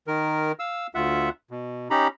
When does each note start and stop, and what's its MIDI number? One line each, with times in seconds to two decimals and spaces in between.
0.07 0.52 51
0.07 0.52 70
0.59 0.87 77
0.59 0.87 88
0.95 1.29 38
0.95 1.29 65
0.95 1.29 76
0.95 1.29 78
1.51 1.88 47
1.90 2.08 61
1.90 2.08 63
1.90 2.08 67
1.90 2.08 82
1.90 2.08 83